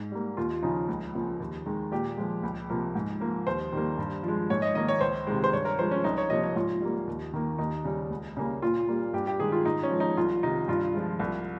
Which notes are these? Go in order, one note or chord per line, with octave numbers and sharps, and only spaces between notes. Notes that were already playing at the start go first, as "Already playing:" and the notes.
Already playing: G#2
G3 A#3
D#2 F4
C#3 F3 D#4
C#2
C#3 F3 A#3
D#2
D#3 G#3
A#2 G4
F3 G#3
C#2
C3 F3 A#3
G#2
F3 A#3
D#2 C5
D#3 G3 A#3
G2
F3 G#3
G#2 C#5
D#5
D#3 A#3 D#5
C#5
C#2 C5
C3 D#3 G#3
C5
G2 C#5
A#4
F3 G#3 C5
C#4
C2 D#4
C#5
C3 F3 A#3 D#5
C#5
G#2 F4
G3 A#3
D#2
D#3 A#3
D#2 D#4
C#3 G3
C#2
C#3 G3 A#3
A#2 F4
G3 A#3
G2 G4
G4
D#3 G#3 G#4
F4
G#2 D#4
C#4
F3 G#3
D#4
C2 F4
C3 D#3 D#4
G2 F4
F3 G#3
C2